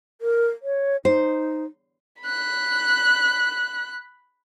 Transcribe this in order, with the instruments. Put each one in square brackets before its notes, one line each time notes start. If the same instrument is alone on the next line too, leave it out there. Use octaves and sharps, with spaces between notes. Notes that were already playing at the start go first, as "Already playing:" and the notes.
[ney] A#4
C#5
[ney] D#4 [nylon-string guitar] C5
[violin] B5 F#6